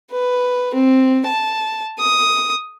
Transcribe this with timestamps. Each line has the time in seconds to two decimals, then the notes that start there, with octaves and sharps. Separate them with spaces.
0.11 B4
0.75 C4
1.26 A5
1.99 D#6